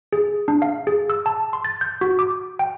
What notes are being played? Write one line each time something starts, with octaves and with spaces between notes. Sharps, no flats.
G#4
D4
F5
G#4
E6
A5
C6
A6
G6
F#4
D6
G5